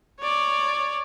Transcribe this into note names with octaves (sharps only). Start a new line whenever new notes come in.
C#5 D5